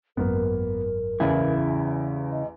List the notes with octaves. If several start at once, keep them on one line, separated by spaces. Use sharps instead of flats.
G#1 F#2 A#3 B3 A#4
A1 E2 C#3 E4
D#5